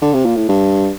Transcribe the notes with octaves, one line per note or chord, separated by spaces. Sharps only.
D3
C3
A#2
A2
G2